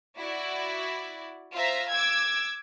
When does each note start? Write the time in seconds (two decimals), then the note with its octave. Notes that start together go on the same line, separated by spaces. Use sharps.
0.16 E4 F#4 D5
1.53 F4 C5 E5 A#5
1.89 D6 E6 G#6